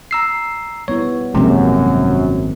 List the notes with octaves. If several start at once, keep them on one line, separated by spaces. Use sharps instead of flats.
A#5 E6 C7
G3 B3 E4 C#5
G#1 F#2 C3 F3 G3 G#3 A#3 C4